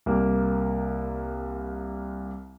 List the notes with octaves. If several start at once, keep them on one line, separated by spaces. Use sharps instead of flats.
C2 A#3